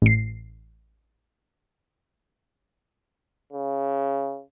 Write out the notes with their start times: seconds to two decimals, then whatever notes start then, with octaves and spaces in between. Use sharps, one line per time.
0.02 A1 C7
3.53 C#3